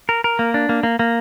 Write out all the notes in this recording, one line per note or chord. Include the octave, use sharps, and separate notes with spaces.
A#4
A#4
A#3
D4
A#3
A#3
A#3